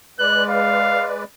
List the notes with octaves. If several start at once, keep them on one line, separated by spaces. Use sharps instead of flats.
G#3 B4 D5 F#6
F5